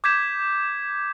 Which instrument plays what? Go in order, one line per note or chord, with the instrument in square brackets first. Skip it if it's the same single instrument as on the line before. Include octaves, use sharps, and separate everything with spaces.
[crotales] D6 G6 G#6 B6 E7